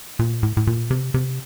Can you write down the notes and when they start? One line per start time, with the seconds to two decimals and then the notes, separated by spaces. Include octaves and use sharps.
0.19 A#2
0.43 A2
0.57 A2
0.67 A#2
0.91 C3
1.14 C3